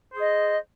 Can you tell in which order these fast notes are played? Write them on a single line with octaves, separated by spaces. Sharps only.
C5 G#4 D#5